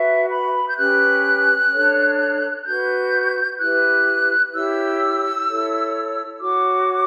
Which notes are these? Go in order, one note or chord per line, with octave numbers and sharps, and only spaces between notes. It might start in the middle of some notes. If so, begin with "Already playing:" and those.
Already playing: F#4 B4 E5
B5
G6
C#4 G4 B4 F#6
D4 A4 C#5
F#4 B4 G6
E4 G4 B4 F#6
E4 G4 C#5 E6
E4 A4 C#5
F#4 C#5 D6